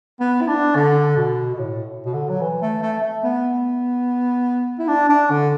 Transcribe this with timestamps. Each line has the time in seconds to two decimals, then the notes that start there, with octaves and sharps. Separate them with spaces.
0.20 B3
0.41 E4
0.48 D4
0.75 D3
1.17 B2
1.54 B2
1.59 A2
2.06 B2
2.14 D3
2.29 F#3
2.41 E3
2.62 A3
2.82 A3
3.02 A3
3.24 B3
4.79 E4
4.88 D4
5.09 D4
5.30 D3